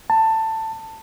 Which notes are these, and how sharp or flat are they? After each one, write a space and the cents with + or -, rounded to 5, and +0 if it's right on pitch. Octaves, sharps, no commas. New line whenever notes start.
A5 +15